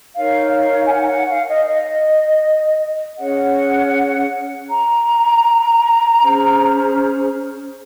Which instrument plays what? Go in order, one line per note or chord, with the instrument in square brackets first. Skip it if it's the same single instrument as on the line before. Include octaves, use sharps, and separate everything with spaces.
[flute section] D#4 A#4 C#5 F5
F5
G#5
F#5
F#5
F5
D#5
D#5
C#4 G#4 C#5 F#5
A#5
C#4 G#4 C5